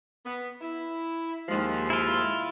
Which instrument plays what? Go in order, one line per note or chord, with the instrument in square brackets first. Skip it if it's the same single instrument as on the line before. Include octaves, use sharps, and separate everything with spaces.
[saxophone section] B3
E4
[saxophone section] D#2 F3 [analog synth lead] G#3
[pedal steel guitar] E4 F4